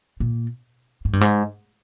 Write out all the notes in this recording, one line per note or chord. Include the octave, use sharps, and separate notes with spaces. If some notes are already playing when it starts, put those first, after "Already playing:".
A#2
G#2
G2
G#2